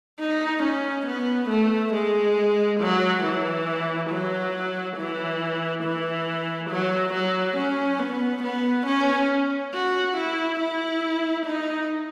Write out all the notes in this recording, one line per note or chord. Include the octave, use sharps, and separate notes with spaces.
D#4
C#4
B3
A3
G#3
F#3
E3
F#3
E3
E3
F#3
F#3
C#4
B3
B3
C#4
F#4
E4
E4
D#4